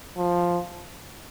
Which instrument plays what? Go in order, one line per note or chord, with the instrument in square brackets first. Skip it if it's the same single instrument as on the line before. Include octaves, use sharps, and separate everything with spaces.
[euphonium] F3